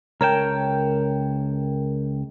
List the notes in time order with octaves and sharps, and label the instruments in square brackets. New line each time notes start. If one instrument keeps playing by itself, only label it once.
[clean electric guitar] C#2 C#5 A5 [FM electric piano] A#4 G5